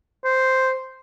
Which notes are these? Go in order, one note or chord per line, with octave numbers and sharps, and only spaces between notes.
C5